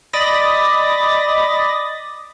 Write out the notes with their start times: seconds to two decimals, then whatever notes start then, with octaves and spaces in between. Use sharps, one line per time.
0.13 D5 D#5 B5 A6 A#6